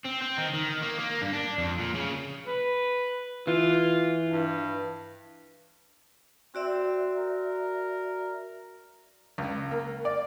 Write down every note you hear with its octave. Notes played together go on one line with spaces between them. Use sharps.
C4
C4
D#3
D#3
A#3
A#3
G2
D4
F2
A#2
C#3
B4
E3 F4
G2
C4 F#4 D5 E5
A#4
C#2
A#3
D5